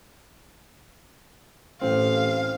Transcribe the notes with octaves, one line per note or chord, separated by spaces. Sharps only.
A1 A2 C4 F5